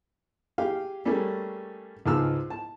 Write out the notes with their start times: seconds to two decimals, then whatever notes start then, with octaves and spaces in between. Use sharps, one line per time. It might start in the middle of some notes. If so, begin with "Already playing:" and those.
0.58 G4 G#4 F5
1.05 G3 A3 A#3 C#4 G#4
2.06 C#2 G#2 G#4 A5 E6 F6
2.50 A5